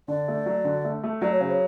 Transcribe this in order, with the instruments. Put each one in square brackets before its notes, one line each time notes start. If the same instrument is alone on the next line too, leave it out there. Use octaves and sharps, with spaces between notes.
[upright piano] D3 [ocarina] D5
[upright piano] A3
F#3
D3
A3
A3
[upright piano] F#3 [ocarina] D5
[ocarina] C#5
[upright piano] C#3 [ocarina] C5
[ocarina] C#5